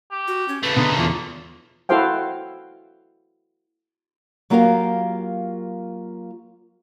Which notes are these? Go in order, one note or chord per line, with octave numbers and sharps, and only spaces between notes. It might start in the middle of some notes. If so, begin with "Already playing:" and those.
G4
F#4
C#4
C#3 A3 B4
B2 D3 D#4
E2 A#3 F4
E4 F#4 A4 C5 F5 G5
F#3 A#3 F4 G4 A#4 F5